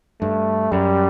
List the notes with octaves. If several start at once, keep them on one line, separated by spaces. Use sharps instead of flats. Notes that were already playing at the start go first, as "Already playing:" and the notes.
G2 A3
F#2 G3